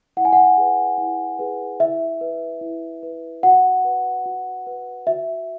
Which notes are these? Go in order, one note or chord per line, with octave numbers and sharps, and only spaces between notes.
E4 F#5
G#5
F#5
G#4 B4
E4
G#4 B4
E4 E5
B4
E4
B4
F#4 F#5
B4
F#4
B4
F#4 E5